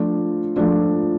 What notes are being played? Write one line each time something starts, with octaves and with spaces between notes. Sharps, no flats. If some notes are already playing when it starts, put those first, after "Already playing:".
Already playing: F3 A3 D4 F4
F3 A3 D4 F4